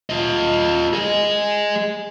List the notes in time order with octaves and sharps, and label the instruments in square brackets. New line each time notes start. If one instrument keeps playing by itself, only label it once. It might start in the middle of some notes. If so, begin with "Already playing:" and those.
[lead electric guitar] F4 D#5
G#4 D#5